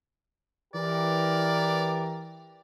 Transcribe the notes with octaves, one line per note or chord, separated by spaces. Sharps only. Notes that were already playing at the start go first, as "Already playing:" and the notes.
E3 G4 A#4 D5